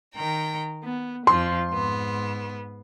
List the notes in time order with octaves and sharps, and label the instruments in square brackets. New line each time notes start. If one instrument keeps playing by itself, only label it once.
[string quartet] D#3 G5 A#5
B3
[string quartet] F2 F3 [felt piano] C6
[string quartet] G#2 B3